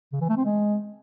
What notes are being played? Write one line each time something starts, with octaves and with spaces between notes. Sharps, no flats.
C#3
E3
A3
C4
G#3